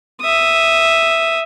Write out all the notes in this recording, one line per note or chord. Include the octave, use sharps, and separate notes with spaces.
E5 D#6